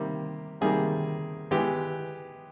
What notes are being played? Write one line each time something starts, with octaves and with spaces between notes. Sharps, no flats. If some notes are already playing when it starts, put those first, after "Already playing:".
Already playing: C3 D#3 G3 A#3
C3 D#3 G3 A#3 G#4
E3 G#3 B3 G4